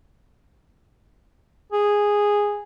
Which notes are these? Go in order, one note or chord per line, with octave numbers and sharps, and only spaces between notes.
G#4